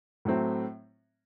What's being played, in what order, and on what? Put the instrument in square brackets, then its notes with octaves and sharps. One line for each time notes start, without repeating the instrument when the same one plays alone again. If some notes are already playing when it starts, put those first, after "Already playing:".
[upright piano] A2 F#3 A3 C4